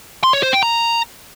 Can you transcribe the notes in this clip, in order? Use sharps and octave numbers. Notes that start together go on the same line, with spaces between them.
C6
C#5
C5
G5
A#5